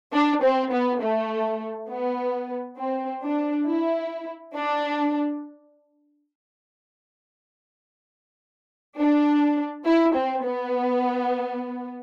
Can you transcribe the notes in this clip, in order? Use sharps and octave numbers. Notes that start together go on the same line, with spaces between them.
D4
C4
B3
A3
B3
C4
D4
E4
D4
D4
E4
C4
B3